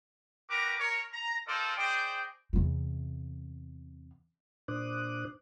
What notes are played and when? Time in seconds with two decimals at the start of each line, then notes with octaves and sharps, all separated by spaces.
0.49 F#4 G4 A#4 B4 A#5 D6
0.79 A#4 C#5
1.12 A#5
1.47 D#4 F4 A4 A#4 C5 D5
1.77 G#4 C5 D5 D#5 G5
2.53 E2 C3
4.68 A#2 D4 C5 D6 D#6 F#6